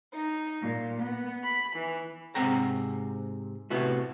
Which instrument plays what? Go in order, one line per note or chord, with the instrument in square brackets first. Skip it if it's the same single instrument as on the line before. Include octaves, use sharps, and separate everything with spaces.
[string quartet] D#4
A#2
B3
B5
E3
[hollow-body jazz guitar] G#2 C3 C4 F#5 G5 A#5
A2 C3 B3 E4 F#4